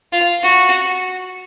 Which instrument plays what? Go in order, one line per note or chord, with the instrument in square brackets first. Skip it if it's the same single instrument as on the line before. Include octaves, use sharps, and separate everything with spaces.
[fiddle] F4
F#4